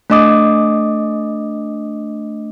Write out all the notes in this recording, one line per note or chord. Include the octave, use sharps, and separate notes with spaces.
A3 D4 D#5 D6 D#6